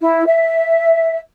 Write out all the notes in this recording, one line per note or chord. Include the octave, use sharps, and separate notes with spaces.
E4
E5